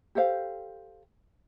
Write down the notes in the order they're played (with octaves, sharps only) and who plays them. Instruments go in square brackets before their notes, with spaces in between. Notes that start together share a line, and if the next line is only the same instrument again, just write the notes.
[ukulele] G4 A4 C5 F5